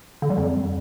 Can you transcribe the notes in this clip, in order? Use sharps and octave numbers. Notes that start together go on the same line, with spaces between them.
D3
G3
F2